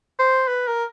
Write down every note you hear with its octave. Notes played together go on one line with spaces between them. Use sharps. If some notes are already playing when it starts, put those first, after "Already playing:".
C5
B4
A#4